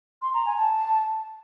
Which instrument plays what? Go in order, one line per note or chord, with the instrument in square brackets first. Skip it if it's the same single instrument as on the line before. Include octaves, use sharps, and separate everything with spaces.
[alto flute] C6
A#5
G#5
A5